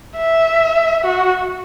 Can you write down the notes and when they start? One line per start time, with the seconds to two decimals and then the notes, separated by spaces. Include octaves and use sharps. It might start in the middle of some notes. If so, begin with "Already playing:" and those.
0.17 E5
1.04 F#4